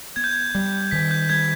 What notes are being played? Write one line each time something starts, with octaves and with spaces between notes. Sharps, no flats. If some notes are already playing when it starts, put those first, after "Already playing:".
B3 G#6
G6
G#6
G3
D#3 B6
G6
G3 G#6